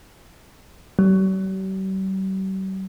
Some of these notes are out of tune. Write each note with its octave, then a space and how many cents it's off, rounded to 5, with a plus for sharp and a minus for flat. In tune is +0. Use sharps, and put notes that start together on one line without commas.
G3 -45